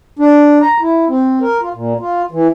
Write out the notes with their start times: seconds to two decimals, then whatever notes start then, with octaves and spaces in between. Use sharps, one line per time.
0.19 D4
0.62 A#5
0.81 E4
1.09 C4
1.41 A#4
1.62 F4
1.74 A#2
2.00 F4
2.31 E3